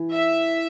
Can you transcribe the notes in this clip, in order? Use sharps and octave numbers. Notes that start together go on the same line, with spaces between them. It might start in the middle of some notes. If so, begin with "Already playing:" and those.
Already playing: E3
E5